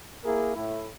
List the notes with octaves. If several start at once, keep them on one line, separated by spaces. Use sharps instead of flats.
A#3 E4 G#4 A#4
A2 E4